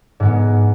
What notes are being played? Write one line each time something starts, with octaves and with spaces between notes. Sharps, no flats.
G#2 G#3 B3